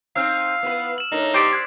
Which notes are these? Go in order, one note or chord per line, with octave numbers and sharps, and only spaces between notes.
C4 D#4 F5 E6 F6
B3 E4 B4
E7 F#7
A2 D4 D#4 A#4
G4 C5 D5 D6 B6
F#6 G#6 C7